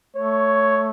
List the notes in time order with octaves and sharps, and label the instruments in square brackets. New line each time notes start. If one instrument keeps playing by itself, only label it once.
[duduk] A3 [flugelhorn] C#5